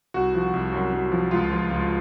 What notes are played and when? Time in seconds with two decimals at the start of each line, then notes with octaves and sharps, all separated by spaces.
0.14 C2 F#4
0.34 F3
0.54 C2
0.72 F#2
0.93 F#2
1.12 F3
1.31 C#2 F4
1.51 F3
1.71 C#2